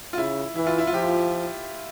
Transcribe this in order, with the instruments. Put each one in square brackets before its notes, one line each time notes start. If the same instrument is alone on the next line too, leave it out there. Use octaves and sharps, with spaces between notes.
[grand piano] F4
[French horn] C#3 [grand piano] E4
[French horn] E3 [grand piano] E4
[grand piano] F4
E4
F4
[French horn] F3 [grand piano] G4